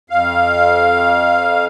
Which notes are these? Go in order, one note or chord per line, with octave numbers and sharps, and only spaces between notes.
F2 F5